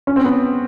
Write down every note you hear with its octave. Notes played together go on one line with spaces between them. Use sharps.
C#4
C4
B3